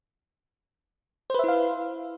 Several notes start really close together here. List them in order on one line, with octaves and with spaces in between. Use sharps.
C5 B4 E5 E4 F5